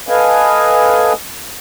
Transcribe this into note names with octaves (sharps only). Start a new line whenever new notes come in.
A4 B4 D#5 F5 G#5